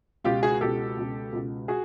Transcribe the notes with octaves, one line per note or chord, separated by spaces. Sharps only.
C#2 B2 F4 G4
F#4 G#4
C#2 B2 G4 A4
C#2 B2
C#2 B2
F#4 G#4